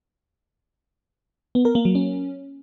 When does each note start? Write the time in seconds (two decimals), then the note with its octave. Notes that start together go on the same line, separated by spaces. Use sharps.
1.55 B3
1.65 A#4
1.75 A#3
1.85 F#3
1.95 C#4